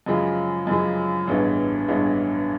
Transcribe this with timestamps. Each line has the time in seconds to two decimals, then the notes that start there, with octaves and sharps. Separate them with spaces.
0.06 F#2 C#3 F3 G#3
0.67 F#2 C#3 F3 G#3
1.27 A1 G2 E3 G#3 B3
1.88 A1 G2 E3 G#3 B3